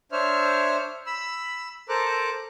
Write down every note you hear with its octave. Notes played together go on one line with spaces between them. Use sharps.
D4 C5 C#5 E5 F6
B5 E6
A4 A#4 C5 A#5 D6 F#6